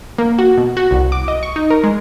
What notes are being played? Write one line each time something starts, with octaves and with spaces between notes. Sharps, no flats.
A#3
F#4
B2
F#4
C2
D6
D#5
C#6
D#4
A#4
G#3